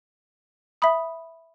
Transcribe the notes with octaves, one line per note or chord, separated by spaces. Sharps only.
E5 B5 D#6